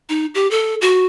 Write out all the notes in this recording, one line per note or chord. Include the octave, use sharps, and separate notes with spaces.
D#4
G4
A4
F#4